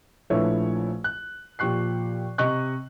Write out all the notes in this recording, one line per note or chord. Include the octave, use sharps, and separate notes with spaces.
A#1 F3 A3 E4 B4 C#5
F#6
A#2 F3 G4 C#6 F#6 C7
C3 D#5 C#6 F#6